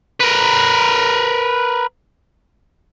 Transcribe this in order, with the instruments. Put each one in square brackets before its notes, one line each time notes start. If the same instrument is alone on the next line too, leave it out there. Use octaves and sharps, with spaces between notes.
[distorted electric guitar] A#4 B4